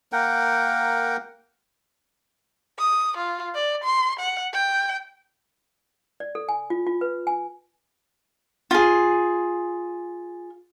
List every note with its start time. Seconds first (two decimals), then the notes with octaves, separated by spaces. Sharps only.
0.12 A#3 A#4 F#5 G5
2.78 D#6
3.18 F4
3.55 D5
3.84 C6
4.19 F#5
4.53 G5
6.20 D5
6.35 A4
6.49 G#5
6.70 F4
6.87 F4
7.01 B4
7.27 G#5
8.71 F4 G#4